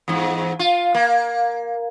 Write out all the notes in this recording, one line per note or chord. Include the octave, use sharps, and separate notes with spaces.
E2 G#2
F4
A#3